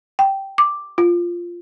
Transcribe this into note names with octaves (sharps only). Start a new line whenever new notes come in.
G5
D6
F4